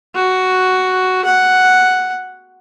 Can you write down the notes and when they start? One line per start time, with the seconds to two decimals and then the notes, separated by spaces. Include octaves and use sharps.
0.15 F#4
1.25 F#5